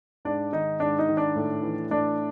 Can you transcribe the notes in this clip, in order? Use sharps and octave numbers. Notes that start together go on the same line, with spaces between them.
G#2 D4 D5
D#3 D#4 D#5
G#2 D4 D5
D#4 D#5
D#3
D4 D5
A2
E3
A2 D4 D5